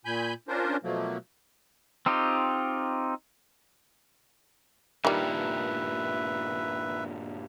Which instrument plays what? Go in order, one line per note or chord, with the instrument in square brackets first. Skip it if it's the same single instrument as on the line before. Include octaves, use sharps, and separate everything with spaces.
[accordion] A#2 G#5 B5 G6
C#4 D4 F4 A#4 C5
B2 F3 F#3 A3 A#3
[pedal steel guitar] C4 D#4 F4 G4
[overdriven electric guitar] G2 A#2 [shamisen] D#3 G3 [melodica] B4 E5